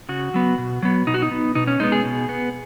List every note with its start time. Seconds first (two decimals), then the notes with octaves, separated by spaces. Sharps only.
0.09 C#3 F#4
0.34 F#3 B3
0.58 B2
0.82 F#3 B3
1.07 B2 D#4
1.14 F#4
1.22 D#4
1.31 B3
1.55 B2 D#4
1.67 C#4
1.80 G#3 B3 D#4
1.92 G#4
2.05 B2
2.29 B3